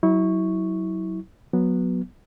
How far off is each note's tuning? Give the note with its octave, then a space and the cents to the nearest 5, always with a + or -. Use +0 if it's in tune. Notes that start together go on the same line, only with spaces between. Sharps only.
F#3 +15 E4 -30 C#6 +0
F#3 -15 B3 -10